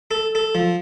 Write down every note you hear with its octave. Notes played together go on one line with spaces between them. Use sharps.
A4
A4
F3